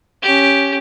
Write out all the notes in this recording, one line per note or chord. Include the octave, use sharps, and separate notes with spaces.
C#4 G4